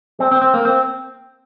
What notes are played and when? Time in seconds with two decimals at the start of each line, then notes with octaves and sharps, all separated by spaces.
0.20 C4
0.31 C4
0.42 C4
0.54 A#3
0.65 C4